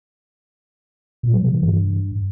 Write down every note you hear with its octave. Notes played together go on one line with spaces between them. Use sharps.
A#2
F#3
C3
E3
G2